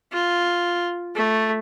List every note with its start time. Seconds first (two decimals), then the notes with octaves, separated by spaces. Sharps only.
0.12 F4
1.15 A3